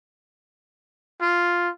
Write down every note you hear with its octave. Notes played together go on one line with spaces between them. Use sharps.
F4